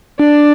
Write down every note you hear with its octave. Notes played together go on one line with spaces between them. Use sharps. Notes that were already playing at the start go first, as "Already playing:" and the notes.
D4 D5